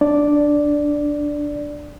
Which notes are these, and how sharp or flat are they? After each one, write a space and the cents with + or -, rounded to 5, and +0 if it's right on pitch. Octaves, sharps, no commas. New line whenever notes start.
D4 +0 D5 +0